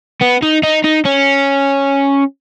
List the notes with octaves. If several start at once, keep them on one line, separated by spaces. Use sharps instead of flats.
B3
D#4
D#4
D#4
C#4